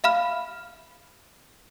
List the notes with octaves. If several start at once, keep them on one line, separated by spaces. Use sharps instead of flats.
E5 F5 B5 F6